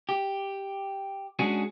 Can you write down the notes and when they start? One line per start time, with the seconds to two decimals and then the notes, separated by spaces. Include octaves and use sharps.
0.09 G4
1.39 G#3 C#4 D4 F#4 G#4